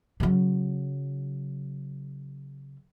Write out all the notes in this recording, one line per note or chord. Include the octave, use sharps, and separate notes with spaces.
C#3 F#3